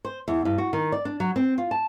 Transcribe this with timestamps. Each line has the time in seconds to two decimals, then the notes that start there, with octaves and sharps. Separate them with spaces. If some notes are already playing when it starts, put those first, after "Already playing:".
0.05 C5
0.28 E2
0.45 G2
0.58 F#4
0.73 D#3
0.92 D5
1.05 D4
1.20 F#3
1.36 C4
1.58 F4
1.71 A5